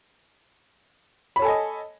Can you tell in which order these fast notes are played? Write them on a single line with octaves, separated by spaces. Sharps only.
B5 C#5 A4 G#5 D#5